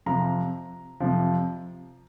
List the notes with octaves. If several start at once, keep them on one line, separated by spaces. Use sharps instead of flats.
F2 C3 F3 A#5
F2 C3 F3